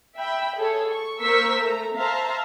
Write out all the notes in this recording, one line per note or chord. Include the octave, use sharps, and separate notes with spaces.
E5 G5 B5
G#4 A4 C#5
C#6
A#3 A#4 C5 C#6 E6 B6
A3 A#5
C5 E5 F5 A5 A#5